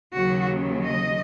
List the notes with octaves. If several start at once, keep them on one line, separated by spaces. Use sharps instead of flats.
D#2 C#3 F#3 F#4
D#5